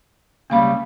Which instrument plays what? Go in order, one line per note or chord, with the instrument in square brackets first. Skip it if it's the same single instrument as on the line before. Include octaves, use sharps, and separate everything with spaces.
[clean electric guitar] C#2 C#3 G3 [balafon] A#3 F5 B5